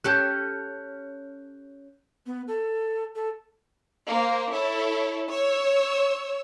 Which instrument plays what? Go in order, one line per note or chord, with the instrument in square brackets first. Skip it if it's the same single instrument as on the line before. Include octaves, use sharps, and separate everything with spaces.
[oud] C#4 G4 A4 [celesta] F#6 G6
[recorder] B3
A4
A4
[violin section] A#3 C5
E4 A4 C#5
C#5 E6